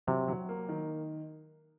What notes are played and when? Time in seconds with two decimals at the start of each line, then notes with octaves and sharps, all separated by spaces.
0.07 C3 F#3
0.28 F#3
0.49 A#3
0.69 D#3